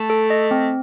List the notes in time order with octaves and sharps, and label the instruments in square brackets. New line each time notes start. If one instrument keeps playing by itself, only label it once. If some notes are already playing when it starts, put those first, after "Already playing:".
Already playing: [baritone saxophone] A3 [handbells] A5
[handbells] A4
D#5
C4